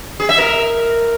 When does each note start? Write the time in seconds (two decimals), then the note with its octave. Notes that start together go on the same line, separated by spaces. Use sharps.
0.20 G#4
0.29 E5
0.38 A#4